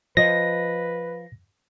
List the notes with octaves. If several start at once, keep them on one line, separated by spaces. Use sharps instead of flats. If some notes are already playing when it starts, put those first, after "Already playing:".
F3 B4 D#5 A#6